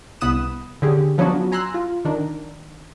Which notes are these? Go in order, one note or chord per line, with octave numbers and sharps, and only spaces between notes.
C2 B3 B5 D#6 F#6 E7
D3 C#4 G4 G#4
F3 F#3 B3 C#4 D4 F#4
G#5 A#5 C6 E6 F#6
F4
D#3 D4 A#4